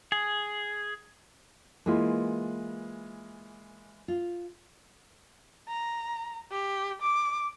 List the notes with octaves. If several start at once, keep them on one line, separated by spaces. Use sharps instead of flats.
G#4
E3 G#3 A#3 F4 B4
F4
A#5
G4
D6